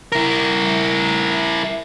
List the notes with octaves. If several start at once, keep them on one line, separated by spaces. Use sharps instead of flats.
E4 A#4